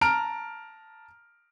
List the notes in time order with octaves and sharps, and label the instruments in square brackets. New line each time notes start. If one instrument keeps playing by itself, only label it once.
[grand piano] A5 A#5 F6 D7